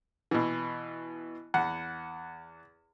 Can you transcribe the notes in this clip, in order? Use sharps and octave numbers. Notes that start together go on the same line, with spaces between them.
B2 E3
E2 F#5